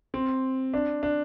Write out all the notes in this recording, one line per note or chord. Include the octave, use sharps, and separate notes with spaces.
C4
D4
D4